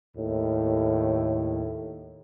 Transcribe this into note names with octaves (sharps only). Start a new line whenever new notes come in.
D#2 A2